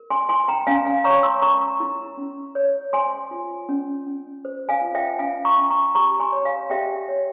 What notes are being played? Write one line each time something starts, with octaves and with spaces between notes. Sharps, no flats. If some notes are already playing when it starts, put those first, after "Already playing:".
Already playing: A#4
G#5 C6
E4 G#5 C6
G5 A#5
C#4 F5 G#5
F5 G#5
C#5 A#5 C#6
C6 E6
A#4 A#5 C#6
E4
C#4
C#5
C5 G#5 C6
F4
C#4
C#4
C5
F5 G#5
F4
E5 G5
C#4 F5 G#5
A#5 C#6
C#4
A#5 C#6
G4 A#5 C#6
G#5 C6
C#5
F5 G#5
G4 E5 G5
C#5